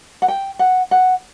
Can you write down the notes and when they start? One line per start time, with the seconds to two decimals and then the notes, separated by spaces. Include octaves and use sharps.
0.22 F#5
0.28 G5
0.59 F#5
0.91 F#5